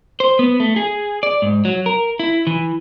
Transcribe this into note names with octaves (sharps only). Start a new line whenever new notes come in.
C5
B3
A3
G#4
D5
G#2
F#3
A#4
E4
E3